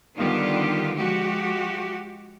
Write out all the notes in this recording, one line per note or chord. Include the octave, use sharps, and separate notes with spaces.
D3 D#3 G3 B3 F4 G4
F3 G#3 F#4 G4